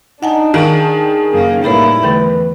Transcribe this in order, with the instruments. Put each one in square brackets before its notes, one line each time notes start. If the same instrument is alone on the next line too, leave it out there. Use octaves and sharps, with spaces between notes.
[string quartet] D4 [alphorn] D#4 [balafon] F#5 G#5 A5
[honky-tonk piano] D#3 [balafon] D#4 F5 [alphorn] G#4
[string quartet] F#2 C#3 A#3
[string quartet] A2 G3 E4 [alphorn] A#3 [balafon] A4 B4 C#5
[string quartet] E2 [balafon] D3 A3 A4 [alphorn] B4